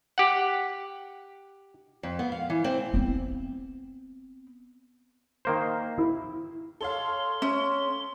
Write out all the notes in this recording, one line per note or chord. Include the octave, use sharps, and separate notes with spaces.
G4 F#5
F2
B3
F5
E3
C4
B3 C4
D#3 A#3 C5
E4
A4 C#5 F5 C6
C#4